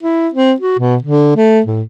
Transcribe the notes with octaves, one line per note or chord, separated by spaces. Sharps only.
E4
C4
F#4
B2
D3
A3
A2